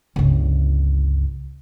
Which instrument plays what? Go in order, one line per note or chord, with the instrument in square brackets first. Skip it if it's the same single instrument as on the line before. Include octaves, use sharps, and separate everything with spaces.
[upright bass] G1 C#2